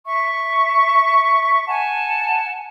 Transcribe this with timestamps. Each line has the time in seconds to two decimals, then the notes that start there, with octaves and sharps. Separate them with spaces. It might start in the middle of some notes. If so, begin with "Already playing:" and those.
0.05 E5 C#6
1.66 F#5 G#5 A5